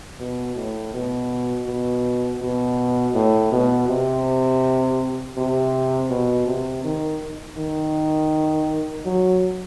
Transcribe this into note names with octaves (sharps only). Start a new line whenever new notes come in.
B2
A2
B2
B2
B2
A2
B2
C3
C3
B2
C3
D#3
D#3
F#3